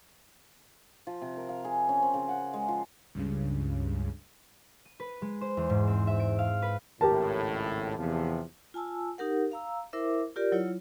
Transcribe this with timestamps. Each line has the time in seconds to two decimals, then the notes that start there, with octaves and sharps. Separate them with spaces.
1.07 F3
1.22 C3
1.37 A#4
1.49 F5
1.64 G#4
1.89 C#4
2.02 C4
2.14 C#3
2.29 F#5
2.53 G#3
2.68 F3
3.15 C#2 G2 C#3
4.85 D#7
5.00 B4
5.22 G#3
5.41 C5
5.57 E2
5.70 G#2
5.87 C4
6.07 E5
6.19 D7
6.39 F5
6.62 B4
7.01 G#1 C#2 A2 G4 A#4 A5
7.98 E2 C3 F3
8.74 F4 G#5 A5 E6
9.18 D#4 G4 A#4 F#5
9.52 F5 A#5 E6
9.93 E4 A#4 C5 E5 D6
10.36 F4 G4 A#4 D5
10.52 F#3 E4 F4 C#5